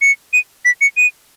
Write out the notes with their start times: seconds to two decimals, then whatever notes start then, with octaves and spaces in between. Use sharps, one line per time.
0.02 C#7
0.33 D#7
0.65 B6
0.81 C#7
0.97 D#7